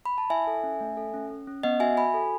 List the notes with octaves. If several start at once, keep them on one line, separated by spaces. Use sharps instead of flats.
B5
A5
E4 E5 G#5
A4
C#4
A3
A4
C#4
C#4
C#4
B3 D#5 F#5
F#4 E5 G#5
F#4 G#5 B5
A4